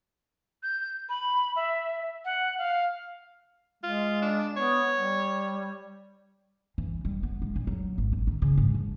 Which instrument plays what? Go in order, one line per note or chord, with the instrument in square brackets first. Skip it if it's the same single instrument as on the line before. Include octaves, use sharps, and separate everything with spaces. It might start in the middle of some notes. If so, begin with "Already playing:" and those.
[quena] G6
B5
E5
F#5
F5
[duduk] G#3 [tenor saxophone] F4
[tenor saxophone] D4
[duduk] B3 [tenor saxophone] C#5
[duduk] G3
[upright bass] E3
G3
B3
G#3
A#2
F#3
G#1
A1
D#3
C#3
G#2
F3